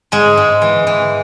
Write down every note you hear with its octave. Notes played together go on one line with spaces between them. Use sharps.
G#2 G#3
G#2
E3
E3